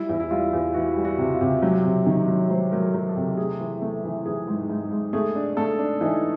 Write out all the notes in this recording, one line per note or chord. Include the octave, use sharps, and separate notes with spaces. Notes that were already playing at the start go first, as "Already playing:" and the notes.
Already playing: G3 E4
E2
E4
G3 F4
E2
E3 F#4
G3
F#4
C3
F4
C3
F#3 G4
C3
D#3 C#5
F#3
F#3 C5
F#3 A#4
A4
F#3
A4
C3
G4
A3 G#4
E3
A3
E3
E3 G#4
G#2
G#2
G#2
A3 G#4
D4
A3 A4
D4
E3 D#4